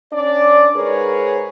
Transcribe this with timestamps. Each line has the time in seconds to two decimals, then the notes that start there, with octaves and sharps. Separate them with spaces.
0.12 C#4 D4 D5
0.75 G#2 G#4 A#4 B4 C#5